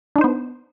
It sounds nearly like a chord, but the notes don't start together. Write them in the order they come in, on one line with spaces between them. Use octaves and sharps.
D4 D#4 C5 B3